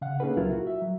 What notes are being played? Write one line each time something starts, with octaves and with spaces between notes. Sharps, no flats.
C#3 F5 F#5
A#3 C#4 D#4 G#4 A4 B4
C#2 F#3 E4 F4 A#4
F#4
E5
F#3